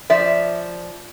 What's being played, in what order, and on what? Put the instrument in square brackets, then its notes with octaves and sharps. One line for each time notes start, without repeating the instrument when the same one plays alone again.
[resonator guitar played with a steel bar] F3 D5 E5